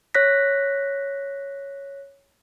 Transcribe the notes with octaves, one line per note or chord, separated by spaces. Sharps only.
C#5 F#6 A#6 B6